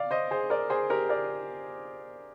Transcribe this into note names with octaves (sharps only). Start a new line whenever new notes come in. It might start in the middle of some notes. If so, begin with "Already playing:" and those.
Already playing: D5 F5
C5 D#5
G#4 C5
A#4 D5
G#4 C5
G4 A#4
A#4 D5